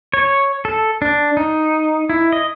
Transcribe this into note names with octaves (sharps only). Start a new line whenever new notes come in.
C#5
A4
D4
D#4
E4
D#5